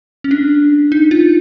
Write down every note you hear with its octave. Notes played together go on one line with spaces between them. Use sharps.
C#4
D4
D#4
F4